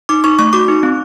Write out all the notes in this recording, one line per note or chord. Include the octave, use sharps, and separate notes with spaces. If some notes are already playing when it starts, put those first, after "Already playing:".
D#4 D6
D#4 C#6
A3 C#6
F#4 D6
D#4
C4